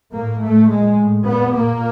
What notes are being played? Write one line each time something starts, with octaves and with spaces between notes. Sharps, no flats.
A2 A#3
A2 A3
A#2 G#3
A2
A#2 B3
A#2 A#3